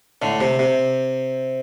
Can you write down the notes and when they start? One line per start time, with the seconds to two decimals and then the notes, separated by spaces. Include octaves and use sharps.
0.22 A2 D3
0.41 C3
0.59 C3